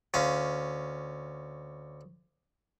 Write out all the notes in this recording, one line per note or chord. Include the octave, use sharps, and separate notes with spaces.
D2 C#4 F5